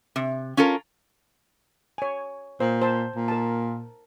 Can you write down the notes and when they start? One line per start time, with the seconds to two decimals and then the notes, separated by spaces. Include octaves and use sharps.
0.16 C3
0.57 C#4 F4 A4 A#4
1.98 C#5 G#5
2.60 A#2 C5
2.82 C5 A5
3.15 A#2
3.28 A#4 A5